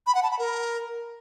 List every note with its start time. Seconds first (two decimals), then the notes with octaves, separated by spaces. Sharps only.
0.07 B5
0.15 F#5
0.23 A5
0.31 B5
0.39 A#4